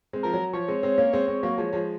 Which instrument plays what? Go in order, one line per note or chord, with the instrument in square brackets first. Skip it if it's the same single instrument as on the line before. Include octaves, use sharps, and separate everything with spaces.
[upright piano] G#3 C4
[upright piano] F3 [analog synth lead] A#4
[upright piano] F#3
[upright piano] F3 [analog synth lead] C#5
[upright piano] G#3 C4
G#3 C4
A#3 C#4
G#3 C4
G#3 C4
F#3 A#3
F3 G#3
F3 G#3